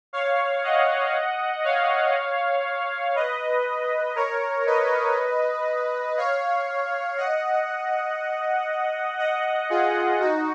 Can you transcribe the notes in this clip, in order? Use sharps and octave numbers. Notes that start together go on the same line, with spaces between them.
C#5 F5
D#5 F#5
C#5 F5
B4 D#5
A#4 C#5
B4 D#5
C#5 F5
D#5 F#5
D#5 F#5
F4 G#4
D#4 F#4